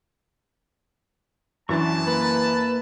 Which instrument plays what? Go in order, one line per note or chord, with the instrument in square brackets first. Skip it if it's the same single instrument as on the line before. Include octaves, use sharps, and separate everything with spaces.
[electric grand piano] F#2 E3 D4 [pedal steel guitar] F#4 E5 C#6 [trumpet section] A5
[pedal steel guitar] A#3 [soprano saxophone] B4